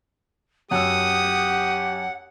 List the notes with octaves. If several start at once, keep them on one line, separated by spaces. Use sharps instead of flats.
F#2 G4 F#5 D#6 E6